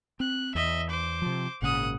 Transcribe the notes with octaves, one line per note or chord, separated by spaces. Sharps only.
C4 F#6
E2 D#5 E5
C5 D6
C3 F3
G#1 A#2 C#3 F#5 D#6